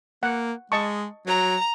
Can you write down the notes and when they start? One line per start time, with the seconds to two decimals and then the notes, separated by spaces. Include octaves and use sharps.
0.23 A#3 F#5
0.72 G#3 D#5 A5 C#6
1.27 F#3 A#5